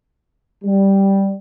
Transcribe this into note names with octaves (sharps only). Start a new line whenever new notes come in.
G3